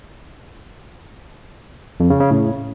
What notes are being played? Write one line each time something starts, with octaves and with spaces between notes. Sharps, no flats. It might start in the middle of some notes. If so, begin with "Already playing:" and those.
F2
C#3
C#3
A2